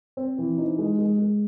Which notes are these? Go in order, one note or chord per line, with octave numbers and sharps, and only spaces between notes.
C4
E3
D#4
G#3
G#3
G#3